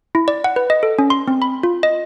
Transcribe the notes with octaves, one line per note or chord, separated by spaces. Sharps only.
E4
D5
F#5
B4
D#5
A4
C#4
C6
C4
B5
F4
D#5